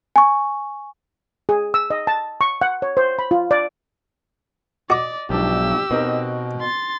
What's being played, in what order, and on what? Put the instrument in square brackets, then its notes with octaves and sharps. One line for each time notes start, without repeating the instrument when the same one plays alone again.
[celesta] G#5 C#6
[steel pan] G#4
E6
D#5
A5
C#6
F#5
C#5
C5
B5
F4
D5
[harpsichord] F#4 D6 [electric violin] D5 [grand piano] D#5
[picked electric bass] B1 [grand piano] G#2 F3 D4 [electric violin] G4 E6
[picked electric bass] B2 [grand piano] C4 D#4 A#4
[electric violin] C6 A6